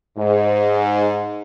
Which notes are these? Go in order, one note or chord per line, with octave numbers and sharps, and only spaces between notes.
G#2